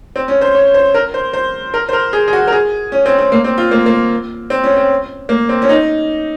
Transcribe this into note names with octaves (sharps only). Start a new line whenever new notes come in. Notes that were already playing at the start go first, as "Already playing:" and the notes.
C4
C#4
C5
C#5
C5
A#4
C5
C5
A#4
C5
A#4
G#4
G#4
F#4
A#4
G#4
C#4
C4
C4
A#3
C4
F4
A#3
A#3
C4
C#4
C4
A#3
C4
C#4
D#4